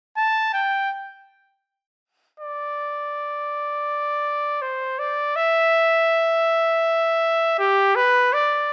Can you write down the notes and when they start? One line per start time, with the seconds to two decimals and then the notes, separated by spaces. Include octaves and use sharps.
0.17 A5
0.54 G5
2.40 D5
4.62 C5
4.99 D5
5.36 E5
7.58 G4
7.95 B4
8.33 D5